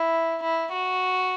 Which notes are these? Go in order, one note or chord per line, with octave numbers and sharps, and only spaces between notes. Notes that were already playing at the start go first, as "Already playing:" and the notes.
Already playing: E4
E4
F#4